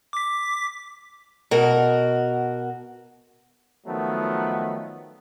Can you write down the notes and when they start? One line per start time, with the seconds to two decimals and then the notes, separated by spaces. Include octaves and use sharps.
0.13 D6 B6
1.51 B2 F#4 A#4
3.86 D#3 F3 F#3 A3 B3